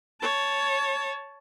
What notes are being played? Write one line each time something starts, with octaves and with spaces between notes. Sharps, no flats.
C#5 A5